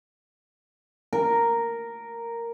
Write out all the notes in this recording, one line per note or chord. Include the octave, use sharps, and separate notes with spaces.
A#4